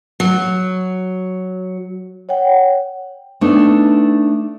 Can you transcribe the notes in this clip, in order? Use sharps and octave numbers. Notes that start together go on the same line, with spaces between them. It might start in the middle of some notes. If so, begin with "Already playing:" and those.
F#3
C#5 F#5 G5
A3 B3 D4 D#4